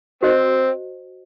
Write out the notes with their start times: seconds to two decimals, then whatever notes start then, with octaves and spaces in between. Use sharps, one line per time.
0.23 D#3 C4 F#4 C5 D#5